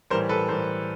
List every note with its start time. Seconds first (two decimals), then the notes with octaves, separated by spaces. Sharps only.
0.10 A2 E3 G3 A#4 C5
0.29 A4 B4
0.48 A2 E3 G3 A#4 C5